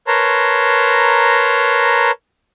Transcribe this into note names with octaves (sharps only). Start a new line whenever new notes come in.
A#4 B4 C#5 A5 A#5 C6